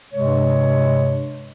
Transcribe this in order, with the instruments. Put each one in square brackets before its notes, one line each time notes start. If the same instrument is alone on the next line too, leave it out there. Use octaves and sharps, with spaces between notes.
[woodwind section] G2 C3 G#3 C#5